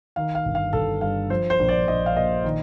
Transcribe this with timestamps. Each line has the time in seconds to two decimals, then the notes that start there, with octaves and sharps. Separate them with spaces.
0.16 D#3 F5
0.35 F5
0.45 G1
0.55 F5
0.73 G1 A4
1.01 G2 F5
1.30 F3 C5
1.50 C5
1.59 A#1
1.69 D5
1.87 A#1 D#5
2.06 F5
2.16 A#2 D#5
2.44 D#3